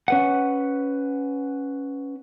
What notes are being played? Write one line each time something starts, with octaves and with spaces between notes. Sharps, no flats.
C#4 B4 F#5